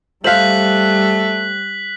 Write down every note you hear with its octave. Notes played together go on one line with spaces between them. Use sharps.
G3 A3 C5 F5 F#6 B6 F#7